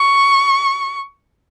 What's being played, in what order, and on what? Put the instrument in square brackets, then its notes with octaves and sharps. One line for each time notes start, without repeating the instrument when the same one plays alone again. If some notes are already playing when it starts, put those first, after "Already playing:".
Already playing: [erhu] C#6